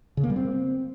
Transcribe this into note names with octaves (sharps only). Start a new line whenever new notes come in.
C#3
A#3
G3
C4